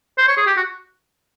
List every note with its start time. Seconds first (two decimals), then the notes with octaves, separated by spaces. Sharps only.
0.18 C5
0.28 C#5
0.37 G#4
0.47 G4
0.57 F#4